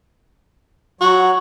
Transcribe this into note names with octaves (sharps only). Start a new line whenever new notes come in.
F#3 F#4 C#5